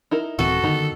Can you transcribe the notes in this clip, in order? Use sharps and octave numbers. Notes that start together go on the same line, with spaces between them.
D#4 E4 A#4
D#1 E3 C4 F#4 A4
F#2 D3 D#3 B3 D#4 G4